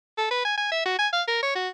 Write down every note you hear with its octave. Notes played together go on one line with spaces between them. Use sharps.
A4
B4
G#5
G#5
E5
F#4
G#5
F5
A#4
C#5
F#4